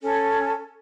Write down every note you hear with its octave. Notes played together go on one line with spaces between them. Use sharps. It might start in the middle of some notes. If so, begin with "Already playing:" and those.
C#4 A4